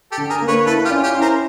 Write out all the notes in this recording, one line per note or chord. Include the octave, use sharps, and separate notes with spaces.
G4 A4
D3
G#4 A#4
A#3
B4 C#5
E4 A4 B4
F4 G4
C#4
F4 G4
E4
A#4 C5